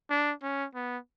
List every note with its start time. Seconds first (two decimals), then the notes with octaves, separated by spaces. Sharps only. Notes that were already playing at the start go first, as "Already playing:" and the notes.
0.10 D4
0.43 C#4
0.75 B3